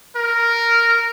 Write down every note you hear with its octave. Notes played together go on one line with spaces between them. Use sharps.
A#4